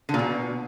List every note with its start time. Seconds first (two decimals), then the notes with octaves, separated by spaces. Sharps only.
0.09 D3
0.14 A#2
0.19 B2